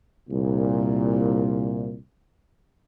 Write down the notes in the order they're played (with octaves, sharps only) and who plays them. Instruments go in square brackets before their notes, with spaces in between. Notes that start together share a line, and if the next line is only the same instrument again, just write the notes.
[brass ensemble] C2 A#2